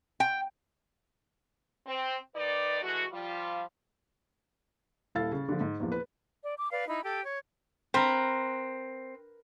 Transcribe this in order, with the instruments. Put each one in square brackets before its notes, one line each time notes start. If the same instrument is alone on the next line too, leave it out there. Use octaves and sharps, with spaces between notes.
[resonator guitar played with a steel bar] G5
[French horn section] C4
D#3 D#4 B4 D5
E3 G#3 A3 F#4
F3 G3 F4
[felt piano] D#1 E4 A4 F5 A6
C#3
D3 F3
G#2
E2 A#2 E3 F3
B4
[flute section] D5
D6
B4 D5 F5
D#4 E4 B5
G4 A4 G5
C#5
[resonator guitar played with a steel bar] C4 [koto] A#4 B4